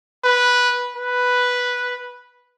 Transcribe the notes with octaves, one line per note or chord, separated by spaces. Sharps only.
B4
B4